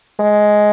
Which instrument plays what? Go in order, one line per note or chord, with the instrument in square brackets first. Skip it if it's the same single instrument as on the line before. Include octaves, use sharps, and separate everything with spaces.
[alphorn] G#3